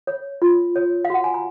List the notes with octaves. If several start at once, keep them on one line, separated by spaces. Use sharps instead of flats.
C#5
F4
C#5
F5
F#4 F#5
G#5
A#5